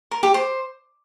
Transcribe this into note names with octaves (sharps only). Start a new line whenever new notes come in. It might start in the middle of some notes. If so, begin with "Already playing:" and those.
A#4
G4
C5